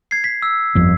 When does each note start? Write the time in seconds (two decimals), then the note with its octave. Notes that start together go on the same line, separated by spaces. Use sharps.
0.11 G#6 C7
0.24 B6
0.42 E6
0.75 G1 F2